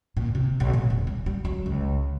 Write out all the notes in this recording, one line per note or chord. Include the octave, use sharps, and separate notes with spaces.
A#2
C3
B1
A#2
E1
G3
G3
F#3
C#2